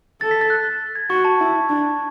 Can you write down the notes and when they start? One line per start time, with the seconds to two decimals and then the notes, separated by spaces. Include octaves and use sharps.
0.21 A4 A6
0.31 B6
0.41 A6
0.50 F#6
0.95 G#6
1.09 F#4 C#6
1.25 A5
1.40 E4
1.69 D4